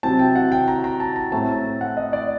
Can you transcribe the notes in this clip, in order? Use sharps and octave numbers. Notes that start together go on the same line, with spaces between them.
C3 F#3 C4 A5
G5
F#5
G5
A#5
A#5
A5
A#5
A2 A3 C4 A5
F#5
D#5
D5